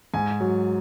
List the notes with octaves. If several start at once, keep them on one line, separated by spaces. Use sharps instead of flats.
G#2 G#5
F#3